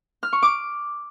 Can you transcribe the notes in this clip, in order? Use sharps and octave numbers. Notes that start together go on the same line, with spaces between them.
F6
C#6
D6